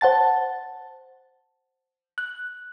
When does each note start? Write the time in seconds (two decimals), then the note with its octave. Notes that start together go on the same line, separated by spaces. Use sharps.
0.01 C5 F#5 A5 A6
2.18 F#6